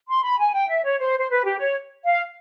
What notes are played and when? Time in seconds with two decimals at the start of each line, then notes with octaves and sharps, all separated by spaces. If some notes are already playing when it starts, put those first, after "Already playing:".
0.08 C6
0.23 B5
0.39 G#5
0.54 G5
0.69 E5
0.84 C#5
0.99 C5
1.19 C5
1.29 B4
1.44 G4
1.59 C#5
2.05 F5